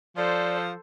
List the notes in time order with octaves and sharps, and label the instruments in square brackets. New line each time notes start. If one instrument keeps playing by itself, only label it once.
[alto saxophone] F3 [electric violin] A4 C5 [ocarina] D5